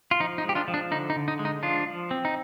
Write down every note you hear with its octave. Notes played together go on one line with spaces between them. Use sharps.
F4
F3 D#4
D#4
G#3
G4
D4 F4
F3
D4
D3 D#4
D#4
D3
D#4
G#3
D#4
F3 D4 F4
F3
C4
D#4